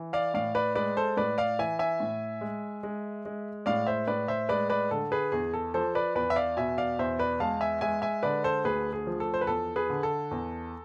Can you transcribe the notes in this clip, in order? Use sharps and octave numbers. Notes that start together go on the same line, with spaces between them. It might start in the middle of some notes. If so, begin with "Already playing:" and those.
Already playing: E3
D5 F5
A2 D5 F5
B4 D5
G#3 B4 D5
A4 C5
A2 B4 D5
D5 F5
E3 E5 G#5
E5 G#5
A2
G#3
G#3
G#3
A2 D5 F5
C5 E5
A2 B4 D5
C5 E5
G#3 B4 D5
B4 D5
D3 A4
G#4 B4
E2 G#4
A4
F3 A4 C5
B4 D5
E2 B4 D5
E5
D5 F5
B2 E5 G#5
D5 F5
E2 C5 E5
B4 D5
G#3 F5 A5
E5 G#5
G#3 E5 G#5
E5 G#5
D3 B4 D5
A4 C5
D2 G#4 B4
G#4
F3
A4
C5
B4
E2 A4
G#4 B4
D3
A4
E2